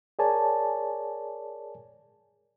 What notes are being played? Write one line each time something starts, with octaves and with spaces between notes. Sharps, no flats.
G#4 A#4 C#5 D5 G#5 A5